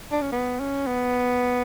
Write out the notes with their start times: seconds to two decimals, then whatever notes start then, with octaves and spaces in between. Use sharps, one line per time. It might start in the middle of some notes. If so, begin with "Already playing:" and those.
0.12 D4
0.21 C#4
0.32 B3
0.60 C#4
0.87 B3